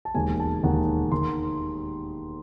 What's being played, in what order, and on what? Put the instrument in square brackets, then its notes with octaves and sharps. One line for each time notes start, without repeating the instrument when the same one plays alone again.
[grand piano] A5
E1 D#2 D#3 G#5
A5
E1 D#2 D#3 F#5
D#3 C6